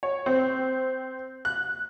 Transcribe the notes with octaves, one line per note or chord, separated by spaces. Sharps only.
C#5
C4
F#6